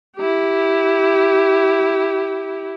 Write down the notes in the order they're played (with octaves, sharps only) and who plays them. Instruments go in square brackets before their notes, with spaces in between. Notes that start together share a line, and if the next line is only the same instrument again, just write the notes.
[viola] E4 G4